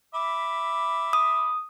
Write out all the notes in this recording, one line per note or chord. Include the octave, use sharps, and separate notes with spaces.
E5 B5 D6
D#6